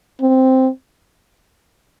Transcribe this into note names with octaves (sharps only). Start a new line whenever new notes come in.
C4